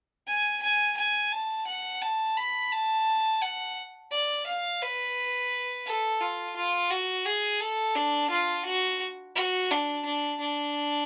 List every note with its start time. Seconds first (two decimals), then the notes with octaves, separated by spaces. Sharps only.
0.27 G#5
0.62 G#5
0.97 G#5
1.32 A5
1.67 F#5
2.01 A5
2.37 B5
2.72 A5
3.41 F#5
4.11 D5
4.46 F5
4.82 B4
5.86 A4
6.21 F4
6.56 F4
6.91 F#4
7.26 G#4
7.60 A4
7.96 D4
8.30 F4
8.65 F#4
9.35 F#4
9.71 D4
10.05 D4
10.40 D4